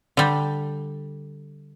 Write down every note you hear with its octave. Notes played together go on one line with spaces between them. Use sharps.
D3 G3